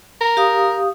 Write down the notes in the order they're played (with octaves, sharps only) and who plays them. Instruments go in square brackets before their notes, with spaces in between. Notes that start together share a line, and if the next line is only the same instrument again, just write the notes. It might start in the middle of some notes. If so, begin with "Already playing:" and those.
[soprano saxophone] A#4
[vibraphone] G4 F5 D#6